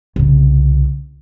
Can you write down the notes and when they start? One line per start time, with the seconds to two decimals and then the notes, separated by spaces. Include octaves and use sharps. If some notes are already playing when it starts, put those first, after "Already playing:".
0.16 C2 C#3